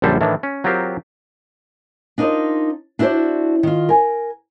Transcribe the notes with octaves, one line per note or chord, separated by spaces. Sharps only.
A#1 F#2 D3 G3 A4 C5
A2 D#3 E3 D4
C#4
F#3 C4 F4 G4 A#4 C5
D4 D#4 F4 A#4 C5 D#5
D4 E4 F#4 B4 C5 D5
D#3 F4
A#4 G#5